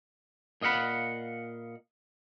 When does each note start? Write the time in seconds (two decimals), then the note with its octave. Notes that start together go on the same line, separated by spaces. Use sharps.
0.62 A#2 D#5 F5 F#5 B5